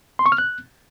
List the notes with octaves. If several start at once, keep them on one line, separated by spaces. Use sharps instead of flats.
C6
C#6
F6
F#6